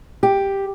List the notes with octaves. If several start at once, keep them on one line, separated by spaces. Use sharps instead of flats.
G4